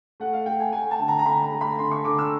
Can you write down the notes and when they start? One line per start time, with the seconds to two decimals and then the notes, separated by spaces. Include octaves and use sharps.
0.20 A3 F#5
0.33 F5
0.46 A3 G5
0.60 G#5
0.72 A3 G#5
0.91 A5
0.99 D3
1.08 A#5
1.19 A#5
1.25 D3 B5
1.43 A#5
1.52 A3
1.61 B5
1.78 D3 C6
1.92 C#6
2.05 D3 D6
2.19 E6